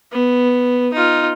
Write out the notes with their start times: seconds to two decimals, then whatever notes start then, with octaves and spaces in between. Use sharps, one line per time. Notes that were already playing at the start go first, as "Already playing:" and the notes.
0.12 B3
0.93 D#4 F4